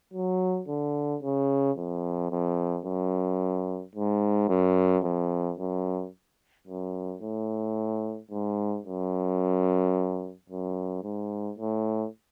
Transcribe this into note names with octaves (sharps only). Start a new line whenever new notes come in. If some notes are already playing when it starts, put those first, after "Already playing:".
F#3
D3
C#3
F2
F2
F#2
G#2
F#2
F2
F#2
F#2
A2
G#2
F#2
F#2
G#2
A2